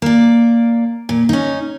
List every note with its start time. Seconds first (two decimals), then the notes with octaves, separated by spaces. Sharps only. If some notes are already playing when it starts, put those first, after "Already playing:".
0.02 A#3 D5
1.09 A#2
1.29 C#4 D#4